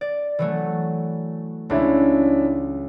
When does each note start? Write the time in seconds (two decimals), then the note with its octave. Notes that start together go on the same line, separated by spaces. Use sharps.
0.01 D5
0.39 E3 F#3 A3
1.70 C#2 C#4 D4 E4